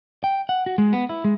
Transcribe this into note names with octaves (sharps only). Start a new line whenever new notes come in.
G5
F#5
F#4
G#3
B3
E4
G#3